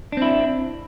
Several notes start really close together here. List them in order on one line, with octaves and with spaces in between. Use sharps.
D4 C4 E4